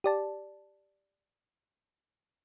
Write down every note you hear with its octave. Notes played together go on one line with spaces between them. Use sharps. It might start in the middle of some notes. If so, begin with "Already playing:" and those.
G4 D5 A5